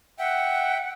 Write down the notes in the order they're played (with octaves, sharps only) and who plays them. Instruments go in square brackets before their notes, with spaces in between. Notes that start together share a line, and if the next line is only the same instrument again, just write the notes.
[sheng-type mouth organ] E5 G5 [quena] F#5